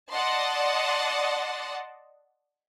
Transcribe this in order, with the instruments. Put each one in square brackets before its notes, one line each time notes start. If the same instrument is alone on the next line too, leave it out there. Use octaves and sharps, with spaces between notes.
[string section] D5 D#5 F#5 A5 C6